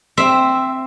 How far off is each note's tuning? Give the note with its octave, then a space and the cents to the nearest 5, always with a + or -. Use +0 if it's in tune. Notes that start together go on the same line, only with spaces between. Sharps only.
C4 +0 E5 +0